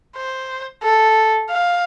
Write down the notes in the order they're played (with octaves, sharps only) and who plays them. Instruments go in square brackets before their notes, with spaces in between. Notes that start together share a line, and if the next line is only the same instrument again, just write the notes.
[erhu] C5
A4
F5